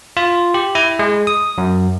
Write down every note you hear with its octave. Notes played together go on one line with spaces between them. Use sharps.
F4
G4
E4
G#3
D#6
F#2